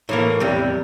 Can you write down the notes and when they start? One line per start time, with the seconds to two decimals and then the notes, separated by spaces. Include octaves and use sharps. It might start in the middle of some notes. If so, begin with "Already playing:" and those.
0.09 A2 E3 A#3
0.40 E2 C3 G3